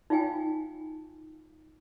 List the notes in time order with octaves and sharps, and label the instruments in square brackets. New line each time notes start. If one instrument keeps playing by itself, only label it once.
[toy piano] D#4 F4 F5 G5 G#5